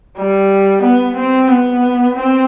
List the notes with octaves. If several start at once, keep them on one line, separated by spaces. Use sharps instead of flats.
G3
B3
C4
B3
C4